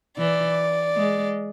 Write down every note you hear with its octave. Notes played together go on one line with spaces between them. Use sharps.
E3 D5
G#3